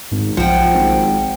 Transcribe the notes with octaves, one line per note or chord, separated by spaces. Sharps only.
G#1 G#2
B1 F3 C5 F#5 G5
G#1